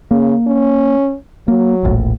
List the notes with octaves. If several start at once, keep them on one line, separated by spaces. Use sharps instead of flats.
C#3 A#3
C#4
F#3 A#3
E1 A#1 A2